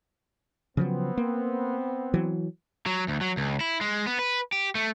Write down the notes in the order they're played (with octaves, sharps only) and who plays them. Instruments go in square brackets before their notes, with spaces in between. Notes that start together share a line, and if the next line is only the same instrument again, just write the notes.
[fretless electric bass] C#3 F3 F#3 [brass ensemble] B3 C4
[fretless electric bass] A#3
E3 F#3
[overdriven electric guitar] F#3
D2
F#3
C#2
E4
G#3
B3
B4
G4
A3